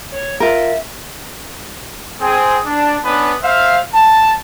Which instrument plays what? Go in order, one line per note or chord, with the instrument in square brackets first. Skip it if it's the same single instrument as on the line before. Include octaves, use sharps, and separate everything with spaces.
[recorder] C#5
[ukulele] F4 A#4 [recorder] E5
[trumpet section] C4 G#4
D4
B3 C#4 D4 B4
C5 E5 F5
A5